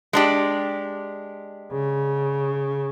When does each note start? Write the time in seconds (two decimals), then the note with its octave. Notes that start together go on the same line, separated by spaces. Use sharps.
0.13 G#3 D4 G4
1.72 C#3